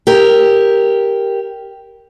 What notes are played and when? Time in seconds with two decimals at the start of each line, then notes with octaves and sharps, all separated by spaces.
0.07 G4 A#4